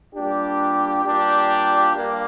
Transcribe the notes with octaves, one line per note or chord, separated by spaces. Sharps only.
A#2 G3 D4 G4
A#2 G3 D4 G4
G2 A#3